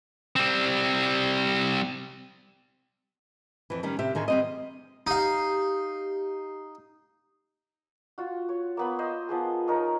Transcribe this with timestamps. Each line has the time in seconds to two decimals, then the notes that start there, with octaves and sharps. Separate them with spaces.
0.36 G3 C4
3.70 F2 E3
3.83 D#3 G3 C#4
3.99 C3 G4 E5
4.15 D3 D#3 G#4
4.28 G3 C4 D#5
5.07 D#4 G4 F5
8.18 F4 F#4
8.49 C#5
8.77 A#3 B3 B5
8.99 C5 D#5 C6
9.29 F3 B3 G#4
9.68 D#4 A#4 C#5 D#5